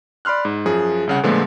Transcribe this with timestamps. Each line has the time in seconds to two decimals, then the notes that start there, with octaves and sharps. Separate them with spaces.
0.25 D5 B5 C6 F6 F#6
0.45 G#2
0.65 F#2 F3 G#4
1.07 C2 C#3 F#5
1.23 A#2 D3 F3 G#3 A3 B3